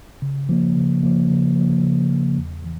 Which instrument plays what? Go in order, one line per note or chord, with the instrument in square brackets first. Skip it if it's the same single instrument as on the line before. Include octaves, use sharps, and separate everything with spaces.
[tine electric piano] C#3
F3 A#3
C#3
F3 A#3
C#3
F3 A#3
C#3
F3 A#3
E2
E3